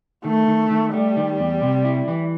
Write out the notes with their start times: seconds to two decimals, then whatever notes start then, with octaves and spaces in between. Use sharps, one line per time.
0.24 D#3 A3
0.48 D#3
0.70 D#3
0.94 G3 A3
1.17 D#3
1.39 E2
1.62 C3
1.85 E4
2.08 E3